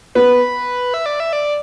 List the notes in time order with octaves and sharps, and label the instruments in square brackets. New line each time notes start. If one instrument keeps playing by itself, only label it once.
[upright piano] B3 [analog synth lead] B4
[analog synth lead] E5
D5
E5
D5